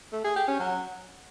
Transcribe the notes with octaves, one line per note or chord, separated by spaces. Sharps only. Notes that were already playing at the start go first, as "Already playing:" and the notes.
A3
G#4
G4
C#4
F#3